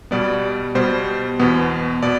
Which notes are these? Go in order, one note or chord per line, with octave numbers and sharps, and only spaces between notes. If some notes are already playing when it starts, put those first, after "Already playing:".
B2 G3 B3 D5
B2 G3 B3 C5
E2 B2 B3
B2 B3 D5